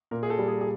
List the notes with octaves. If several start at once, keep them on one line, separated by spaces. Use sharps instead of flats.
A#2 A#4
G#4
A4
G3
G#4
G#4